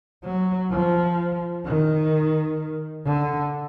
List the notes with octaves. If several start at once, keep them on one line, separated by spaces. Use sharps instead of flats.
F#3
F3
D#3
D3